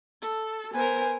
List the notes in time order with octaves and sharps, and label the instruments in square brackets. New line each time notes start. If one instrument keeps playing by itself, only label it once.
[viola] A4
[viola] B3 A#4 [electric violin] C5 G#5